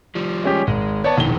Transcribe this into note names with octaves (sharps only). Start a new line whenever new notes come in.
F3 G3
G#3 C#4 G4
G#1 G#3
B3 C#5 D5 A5
E1 A#1 D#3 E3 G7